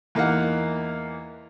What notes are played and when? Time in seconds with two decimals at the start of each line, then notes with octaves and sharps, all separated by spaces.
0.15 E2 A#3 D#4 F5 F#5